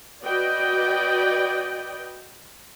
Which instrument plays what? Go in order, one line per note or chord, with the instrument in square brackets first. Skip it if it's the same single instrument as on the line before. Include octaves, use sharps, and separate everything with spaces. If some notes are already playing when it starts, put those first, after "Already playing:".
[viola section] F#4 B4 D5 D#5 G5